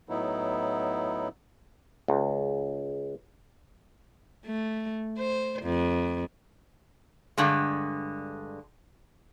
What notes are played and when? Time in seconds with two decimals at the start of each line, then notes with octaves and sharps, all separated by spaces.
0.09 A2 F#3 B3 D#4 E4
2.08 C#2
4.46 A3
5.18 C5
5.63 F2
7.37 G2 D3 G#3